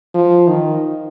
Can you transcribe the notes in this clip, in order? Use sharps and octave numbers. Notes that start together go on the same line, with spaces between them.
F3
D#3